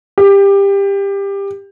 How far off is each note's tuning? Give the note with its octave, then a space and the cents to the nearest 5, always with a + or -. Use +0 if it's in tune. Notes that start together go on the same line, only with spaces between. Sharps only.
G4 +20